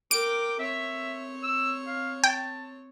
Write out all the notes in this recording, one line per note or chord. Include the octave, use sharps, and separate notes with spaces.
A#4 G5 D6 D7
C4 C#5 E5
E6
F5
G5 A5